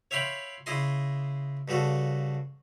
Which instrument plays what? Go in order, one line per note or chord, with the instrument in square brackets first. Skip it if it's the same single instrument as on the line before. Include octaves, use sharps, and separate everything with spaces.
[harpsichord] C#5 E5 F5 G5 B5 C6
C#3 E4 D#5 C6
G2 C#3 F#4 A4